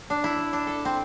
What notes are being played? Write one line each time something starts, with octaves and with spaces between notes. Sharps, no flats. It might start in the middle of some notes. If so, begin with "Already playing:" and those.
D4
E4
D4
A4
C4